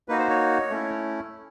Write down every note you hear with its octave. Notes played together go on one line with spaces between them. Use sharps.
A#3 D#4 F#4 B4
C5
C#5
A3 C#4 E4